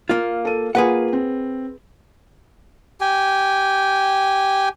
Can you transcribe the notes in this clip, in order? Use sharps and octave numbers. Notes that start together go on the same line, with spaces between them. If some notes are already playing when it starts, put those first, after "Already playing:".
A#3 F4
A4 D#7
A#3 F4 G#4 B4 F#5
C4
G4 G5 G#5